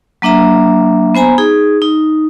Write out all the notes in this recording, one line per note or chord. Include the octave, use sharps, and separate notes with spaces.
F#3 A#3 D4 E5 A#5
B3 C5 G#5 A#5 B5
D#4 G#4
D#4